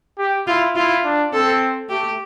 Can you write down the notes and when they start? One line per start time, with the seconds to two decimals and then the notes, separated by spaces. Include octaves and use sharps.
0.18 G4
0.47 E4 F4
0.76 E4 F4
1.05 D4
1.33 C4 A4
1.89 A3 G4